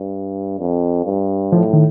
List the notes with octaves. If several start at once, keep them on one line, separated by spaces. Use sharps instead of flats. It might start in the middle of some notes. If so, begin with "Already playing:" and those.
Already playing: G2
F2
G2
A2 F3
D#3